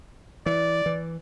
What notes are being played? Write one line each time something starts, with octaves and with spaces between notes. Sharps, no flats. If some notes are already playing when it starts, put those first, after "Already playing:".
E3 D5
E3